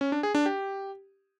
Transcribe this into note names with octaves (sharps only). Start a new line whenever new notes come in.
C#4
D4
G#4
D4
G4